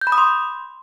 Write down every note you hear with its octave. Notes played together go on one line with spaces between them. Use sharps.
G6
B5
D#6
C6